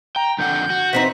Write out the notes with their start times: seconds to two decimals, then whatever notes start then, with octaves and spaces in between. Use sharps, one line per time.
0.16 G5 A#5
0.38 F2 D3 F#5 G6
0.70 F#4
0.93 E3 C4 D#4 B6